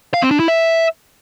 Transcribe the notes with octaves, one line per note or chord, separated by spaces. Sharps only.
F5
C4
D4
E4
E5